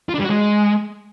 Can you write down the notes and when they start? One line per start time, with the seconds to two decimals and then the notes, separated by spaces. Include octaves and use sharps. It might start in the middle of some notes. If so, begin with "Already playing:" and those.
0.09 F4
0.14 D4
0.19 G3
0.24 F#4
0.29 G#3